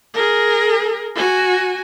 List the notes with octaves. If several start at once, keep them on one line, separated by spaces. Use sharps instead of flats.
G#4 A#4
F#4 G#5